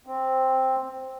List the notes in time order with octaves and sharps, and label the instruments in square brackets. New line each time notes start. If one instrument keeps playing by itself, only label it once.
[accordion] C4